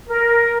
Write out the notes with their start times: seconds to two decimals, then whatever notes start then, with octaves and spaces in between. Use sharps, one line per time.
0.10 A#4